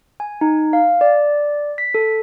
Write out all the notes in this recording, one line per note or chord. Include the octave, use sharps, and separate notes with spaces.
G#5
D#4
F5
D5
B6
A4